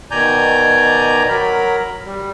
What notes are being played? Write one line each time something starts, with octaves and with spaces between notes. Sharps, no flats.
B2 D#3 D5 G#5 A#5 G6
F#3 A#4 B5
G3